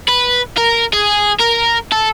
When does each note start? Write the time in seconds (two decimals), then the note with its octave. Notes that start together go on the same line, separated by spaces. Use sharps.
0.09 B4
0.57 A#4
0.93 G#4
1.40 A#4
1.92 A4